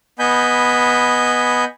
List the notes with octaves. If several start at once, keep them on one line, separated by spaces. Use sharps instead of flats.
B3 D#5 G#5 B5 G6